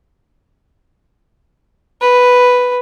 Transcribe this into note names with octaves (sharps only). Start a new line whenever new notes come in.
B4